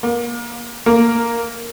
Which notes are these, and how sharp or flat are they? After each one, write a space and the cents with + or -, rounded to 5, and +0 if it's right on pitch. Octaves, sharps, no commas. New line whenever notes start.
A#3 +30
A#3 -5